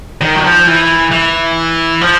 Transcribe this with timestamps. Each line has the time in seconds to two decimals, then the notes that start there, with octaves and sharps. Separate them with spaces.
0.21 D#3
0.35 F#3
0.44 F3
0.67 E3
1.11 E3
2.01 F3